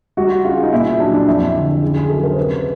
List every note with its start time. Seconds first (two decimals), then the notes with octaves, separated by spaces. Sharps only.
0.17 G3 F#4
0.44 C#3 F4
0.63 D#4
0.72 A#2 E4
1.00 F#3 D4
1.14 D4
1.27 F2 E4
1.55 D3
1.82 C#3
1.97 G#4
2.10 F#3 A4
2.24 A#4
2.31 C5
2.37 C3 B4
2.57 B4